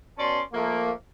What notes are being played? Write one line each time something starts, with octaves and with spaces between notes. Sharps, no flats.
B2 C#4 D5 A5 C6
F3 A3 A#3